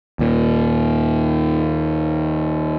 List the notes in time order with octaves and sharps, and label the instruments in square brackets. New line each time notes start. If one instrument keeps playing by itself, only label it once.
[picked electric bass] D#2 A#2